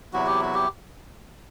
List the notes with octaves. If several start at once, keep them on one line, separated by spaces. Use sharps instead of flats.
E2 C3 F#3 B3 E4 F#4
G4
F#4
G4